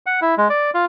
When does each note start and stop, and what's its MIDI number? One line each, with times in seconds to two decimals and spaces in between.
0.06 0.20 78
0.21 0.35 64
0.38 0.48 56
0.50 0.70 74
0.74 0.85 65